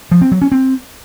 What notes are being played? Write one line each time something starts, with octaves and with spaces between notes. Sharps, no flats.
F3
C4
F#3
C#4
C4